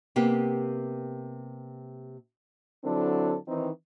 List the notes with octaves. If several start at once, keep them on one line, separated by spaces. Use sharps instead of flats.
C3 A#3 B3 G4
D3 F#3 C4 D4 E4 A4
D#3 E3 C4 D#4